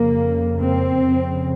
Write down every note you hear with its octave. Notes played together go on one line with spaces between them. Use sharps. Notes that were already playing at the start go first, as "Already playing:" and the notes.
Already playing: F2 C#3 A#3
C4
F2 C#3